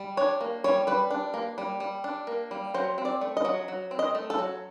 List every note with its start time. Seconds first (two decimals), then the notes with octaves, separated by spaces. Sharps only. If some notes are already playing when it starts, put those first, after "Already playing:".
Already playing: G3
0.17 D4 C#5
0.41 A#3
0.64 G3 C#5
0.87 G3 B4
1.11 D4
1.34 A#3
1.58 G3
1.80 G3
2.04 D4
2.27 A#3
2.51 G3
2.74 F#3 C5
2.98 C4
3.05 D5
3.21 A3
3.37 D#5
3.45 F#3
3.68 F#3
3.91 C4
3.99 D#5
4.15 A3
4.30 A4
4.38 F#3